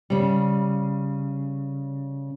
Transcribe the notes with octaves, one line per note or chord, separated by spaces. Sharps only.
C#3 G3